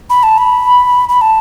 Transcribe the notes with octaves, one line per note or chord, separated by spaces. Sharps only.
B5
A5
B5
B5
A5